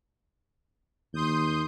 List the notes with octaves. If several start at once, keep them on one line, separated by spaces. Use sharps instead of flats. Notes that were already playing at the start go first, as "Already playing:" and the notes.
D#2 C6 D#6 G6